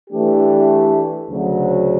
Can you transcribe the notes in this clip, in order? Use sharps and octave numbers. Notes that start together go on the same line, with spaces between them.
E3 A3 D4 G4
D2 C#3 F#3